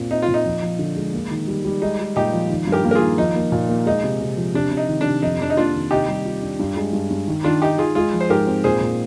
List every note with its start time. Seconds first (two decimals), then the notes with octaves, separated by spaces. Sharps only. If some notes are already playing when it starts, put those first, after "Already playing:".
Already playing: A#2 C4
0.11 C4 D#4
0.22 F4
0.28 A#2
0.34 D#4
0.45 F3
0.62 F3
0.79 D3
0.96 G#3
1.13 A#3
1.31 D#3
1.48 G3
1.65 G3
1.82 G#3 D#4
2.00 G#3
2.16 A#2 D#4 G4
2.33 F3
2.50 D#3
2.67 G2
2.72 G4 A#4
2.85 A#3
2.91 A#4
2.95 F4 G#4
3.01 D#3
3.18 F3 D#4
3.36 A#3
3.52 A#2
3.69 A#3
3.86 G#3 D#4
4.04 C3
4.21 C3
4.37 F3
4.54 C3 D4
4.71 C3
4.77 D#4
4.88 D#3
5.01 C3 D4
5.22 F2 D#4
5.40 F2 D4
5.50 D#4
5.57 A#3 D4 F4
5.74 D#3
5.91 C3 D#4 G4
6.08 G3
6.25 F4
6.42 D4
6.59 G2
6.76 G#3
6.93 G2
7.11 G2
7.28 D#3
7.44 D#3 D4 F4
7.62 D#3 D#4 G4
7.78 D#3 F4 G#4
7.95 G#3 F4 G#4
8.13 F3
8.20 C5
8.30 G#2 G4 A#4
8.47 C4
8.64 A#2 G#4 C5
8.81 A#2